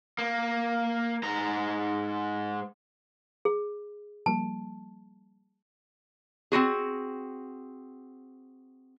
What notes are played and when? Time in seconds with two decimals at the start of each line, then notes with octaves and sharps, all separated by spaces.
0.18 A#3
1.23 G#2 A#5
3.45 G#4
4.26 F3 G3 A#3 A5
6.52 C4 E4 F#4 G#4